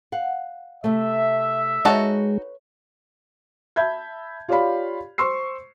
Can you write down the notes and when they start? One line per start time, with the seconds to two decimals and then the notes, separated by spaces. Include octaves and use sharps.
0.12 F5 F#5
0.84 C3 A3 E5
1.85 G#3 D#4 F#4 B4 C#5 A5
3.76 E5 A5 B5 G6 G#6
4.48 F4 G4 C#5 D5 F5 B5
5.18 C5 C6 C#6 E6 C7